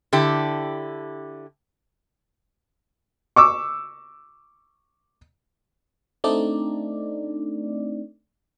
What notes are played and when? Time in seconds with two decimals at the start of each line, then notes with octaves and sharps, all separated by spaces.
0.13 D3 E4 G4
3.36 C#6 D6 E6
6.24 A3 C4 D4 D#4 D5